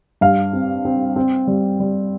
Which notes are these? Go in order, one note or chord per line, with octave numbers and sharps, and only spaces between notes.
G2 F5
C4
C4
C4
G3
G3